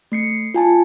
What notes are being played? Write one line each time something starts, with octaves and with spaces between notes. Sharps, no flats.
A3 C7 C#7
F4 G#5 A5